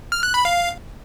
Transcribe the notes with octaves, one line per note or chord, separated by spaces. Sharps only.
F6
F#6
B5
F5